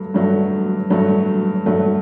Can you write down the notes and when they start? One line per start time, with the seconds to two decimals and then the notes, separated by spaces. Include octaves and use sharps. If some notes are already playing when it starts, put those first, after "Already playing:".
Already playing: G2 F#3 A3
0.14 G2 F#3 A3
0.90 G2 F#3 A3
1.66 G2 F#3 A3